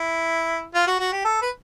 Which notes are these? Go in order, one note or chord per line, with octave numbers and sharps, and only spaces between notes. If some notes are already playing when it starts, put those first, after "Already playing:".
Already playing: E4
F4
F#4
F#4
G4
A4
B4